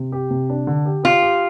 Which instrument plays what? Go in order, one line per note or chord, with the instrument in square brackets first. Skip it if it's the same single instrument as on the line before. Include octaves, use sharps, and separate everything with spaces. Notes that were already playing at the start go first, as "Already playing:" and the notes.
Already playing: [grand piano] C3
G4
C3
D4
D3
G4
[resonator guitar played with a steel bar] F4 [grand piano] G4
[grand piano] G4